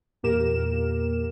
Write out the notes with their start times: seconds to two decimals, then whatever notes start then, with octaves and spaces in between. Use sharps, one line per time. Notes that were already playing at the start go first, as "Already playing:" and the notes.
0.23 E2 A#2 A#3 G4 A#4 E7